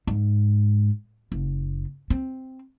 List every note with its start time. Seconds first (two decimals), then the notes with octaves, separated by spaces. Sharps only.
0.07 G#2
1.32 F#1
2.10 C4